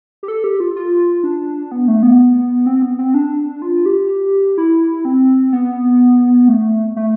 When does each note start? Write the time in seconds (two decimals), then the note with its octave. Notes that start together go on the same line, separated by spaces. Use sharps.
0.23 G4
0.28 A4
0.44 G4
0.60 F4
0.76 F4
1.24 D4
1.72 B3
1.88 A3
2.03 B3
2.66 C4
2.82 B3
2.99 C4
3.14 D4
3.62 F4
3.86 G4
4.58 E4
5.05 C4
5.53 B3
6.48 A3
6.96 A3